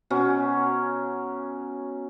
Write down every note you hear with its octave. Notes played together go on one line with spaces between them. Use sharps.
B2 F#3 C#4